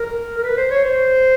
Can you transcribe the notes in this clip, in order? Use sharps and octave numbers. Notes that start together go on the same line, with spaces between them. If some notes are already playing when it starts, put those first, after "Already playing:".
Already playing: A#4
A#4
B4
C5
C#5
C5